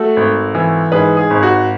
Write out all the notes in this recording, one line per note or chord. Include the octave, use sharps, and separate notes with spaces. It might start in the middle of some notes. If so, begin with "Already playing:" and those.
Already playing: A3 F#4 A4
G#1
E3
G#2 G#4 B4
G#4
G#1
F#4